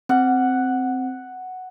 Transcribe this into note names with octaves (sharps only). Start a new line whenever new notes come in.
C4 F#5